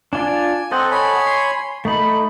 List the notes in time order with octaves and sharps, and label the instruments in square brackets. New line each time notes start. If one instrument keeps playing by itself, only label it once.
[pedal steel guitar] D4 F4 D5 [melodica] G#5
[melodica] C4 C5 [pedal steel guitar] A4 D#5 F#5
[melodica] C#5 G#5 B5
[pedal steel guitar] C6
[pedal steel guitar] A3 B5 [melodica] D#4